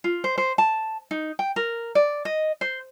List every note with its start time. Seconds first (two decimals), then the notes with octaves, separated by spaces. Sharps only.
0.04 F4
0.24 C5
0.38 C5
0.58 A5
1.11 D#4
1.39 G5
1.56 A#4
1.95 D5
2.25 D#5
2.61 C5